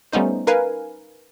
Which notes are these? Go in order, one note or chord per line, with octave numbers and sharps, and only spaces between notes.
G3 A3 B3 C#4 D#4 C5
D#4 A#4 B4 F5 G#5